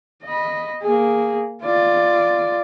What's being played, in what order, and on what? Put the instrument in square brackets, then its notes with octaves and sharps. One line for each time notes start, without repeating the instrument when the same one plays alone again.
[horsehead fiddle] D#5 B5
A#3 G#4
F4 D5